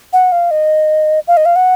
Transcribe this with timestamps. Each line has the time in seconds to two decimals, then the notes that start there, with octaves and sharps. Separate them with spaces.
0.13 F#5
0.32 F5
0.51 D#5
1.28 F5
1.37 D#5
1.46 F5
1.56 F#5